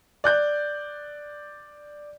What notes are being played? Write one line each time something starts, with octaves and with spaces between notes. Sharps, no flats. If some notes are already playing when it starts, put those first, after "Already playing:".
D5 F#6 G6